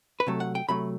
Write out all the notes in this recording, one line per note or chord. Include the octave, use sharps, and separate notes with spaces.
B4
C3 F#3 A3 A4
F#5
G5
C3 F#3 A3 B5